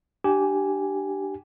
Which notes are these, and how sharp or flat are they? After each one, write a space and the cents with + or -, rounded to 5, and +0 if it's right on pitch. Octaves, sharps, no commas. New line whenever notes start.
D4 +20 G4 -15 G#5 +0